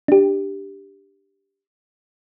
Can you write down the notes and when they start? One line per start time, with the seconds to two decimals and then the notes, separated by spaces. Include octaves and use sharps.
0.08 D4 G4